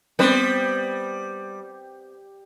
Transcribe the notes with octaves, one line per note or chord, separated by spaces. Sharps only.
G3 B3 C4